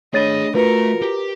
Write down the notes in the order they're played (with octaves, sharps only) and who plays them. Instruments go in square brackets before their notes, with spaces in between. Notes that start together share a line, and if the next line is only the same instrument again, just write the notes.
[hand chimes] A3 D4 [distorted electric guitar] G#4 B5 [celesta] C#5 A6 D#7 [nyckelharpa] D#5
[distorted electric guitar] A3 [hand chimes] F4 F#4 C#7 [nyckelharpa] A#4 [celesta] B4
[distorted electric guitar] G4